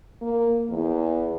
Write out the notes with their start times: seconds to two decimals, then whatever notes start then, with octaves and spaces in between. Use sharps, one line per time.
0.21 A#3
0.70 E2